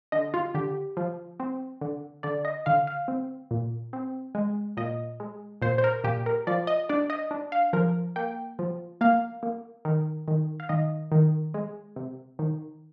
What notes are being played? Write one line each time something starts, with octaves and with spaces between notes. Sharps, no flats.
D3 D#5
F4
D3 G4
F3
C4
D3
D3 D5
D#5
D3 F5
F5
C4
A#2
C4
G#3
A#2 D#5
G#3
A#2 C5
C5
A#4
A#2 G4
A#4
F3 D5
D#5
D4 D5
D#5
D4
F5
F3 A#4
A#3 G5
F3
A#3 F5
A#3
D#3
D#3
F5
D#3 D#5
D#3
G#3
C3
D#3